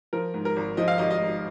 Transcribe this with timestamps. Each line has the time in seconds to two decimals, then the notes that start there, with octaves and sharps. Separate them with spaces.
0.13 F3 A#4
0.34 G#2
0.45 A#4
0.56 G#1
0.77 F3 D#5
0.88 F5
0.98 G#1 D#5
1.11 D#5
1.21 G#2